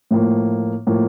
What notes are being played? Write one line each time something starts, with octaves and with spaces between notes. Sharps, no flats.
A2 F3 A#3
A2 F3 A#3